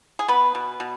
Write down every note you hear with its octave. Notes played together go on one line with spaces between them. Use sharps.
G#4
B3 B4
B2
B2